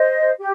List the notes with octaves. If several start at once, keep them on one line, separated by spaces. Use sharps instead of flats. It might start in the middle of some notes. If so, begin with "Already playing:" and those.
Already playing: C5 D#5
G4